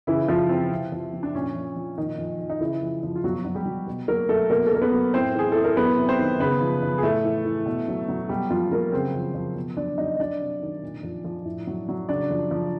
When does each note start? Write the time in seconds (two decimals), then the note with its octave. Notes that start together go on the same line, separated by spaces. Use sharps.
0.07 C#3 E3 E4
0.29 E3 F3 F4
0.49 E3 C4
0.71 C3
0.92 F3
1.14 F3
1.23 D4
1.35 A#2 C#4
1.56 F3
1.76 F3
1.97 A#2 D#3 D#4
2.18 F3
2.40 F3
2.50 D#4
2.61 C#3 E3 E4
2.82 F3
3.03 F3
3.16 F4
3.24 B2 F#3 F#4
3.45 F#3
3.55 G3 G4
3.66 F#3
3.88 B2
4.08 F#3 A#3 A#4
4.29 F#3 A3 A4
4.50 B2 A#3 A#4
4.67 A4
4.71 F#3 A#4
4.82 B3 B4
4.92 F#3
5.14 A2 C4 C5
5.35 E3 G#4
5.52 E3 A4
5.64 A#4
5.76 F#3 B3 B4
5.97 C3
6.08 C4 C5
6.19 D#3
6.40 C#3 B3 B4
6.61 F3
6.83 F3
6.98 G#4
7.03 A2 A3 A4
7.24 E3
7.45 E3
7.66 B2
7.88 F#3
8.09 F#3
8.29 B2 G3 G4
8.50 F3 F#3 F4
8.71 F#3 A#3 A#4
8.92 C#3 C4 C5
9.15 F3
9.35 F3
9.56 B2
9.77 F#3 D4 D5
9.98 F#3 D#4 D#5
10.15 D#5
10.20 F#3 D4 D5
10.41 C3
10.62 D#3
10.83 A#2
11.03 F3
11.25 F3
11.45 A2
11.67 F#3
11.89 F#3
12.09 C#3 D4 D5
12.31 F3
12.51 F3